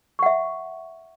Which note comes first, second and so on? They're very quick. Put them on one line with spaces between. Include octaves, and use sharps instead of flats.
C#6 F#5 E5